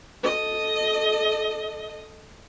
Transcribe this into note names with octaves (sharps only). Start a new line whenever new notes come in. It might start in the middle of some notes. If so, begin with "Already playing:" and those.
A4 D#5